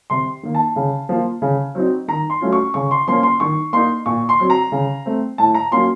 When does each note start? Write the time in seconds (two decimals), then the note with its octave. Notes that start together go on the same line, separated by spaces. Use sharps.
0.10 C3 C6
0.43 D#3 A#3
0.55 A5
0.76 C#3
1.09 F3 A#3 F4
1.42 C#3
1.75 F#3 C4 D#4
2.08 D#3 A#5
2.30 C6
2.41 F#3 A3 C#4 F4
2.53 C#6
2.74 C#3 C#6
2.91 C6
3.08 F3 A#3 C#4 C6
3.23 C6
3.40 D#3 C#6
3.73 A#3 D#4 C6
4.06 A#2 C#6
4.29 C6
4.40 F#3 C4
4.50 A#5
4.72 C#3
5.06 A3 C4
5.38 A2 A5
5.55 A#5
5.71 F#3 A#3 C#4 F4 C6